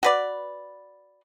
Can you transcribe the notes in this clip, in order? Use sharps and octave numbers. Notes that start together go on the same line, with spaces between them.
F#4 B4 D5